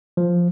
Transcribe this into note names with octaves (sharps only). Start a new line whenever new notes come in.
F3